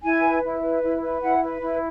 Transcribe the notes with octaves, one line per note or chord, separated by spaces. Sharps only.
E4 G#5
B4
E4
B4
E4
B4
E4 F#5
B4
E4